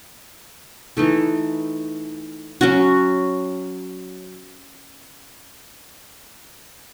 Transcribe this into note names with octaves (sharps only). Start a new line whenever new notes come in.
E3 A3 D#4 A4
F#3 C#4 F#4